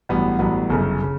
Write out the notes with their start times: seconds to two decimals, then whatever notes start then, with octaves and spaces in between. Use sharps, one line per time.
0.09 A1 G2 F#3 B3
0.39 A1 G2 F#3 B3
0.70 G1 F#2 C#3
1.02 C#3